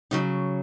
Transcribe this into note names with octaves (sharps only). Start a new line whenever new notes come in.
C#3 F#3 D#4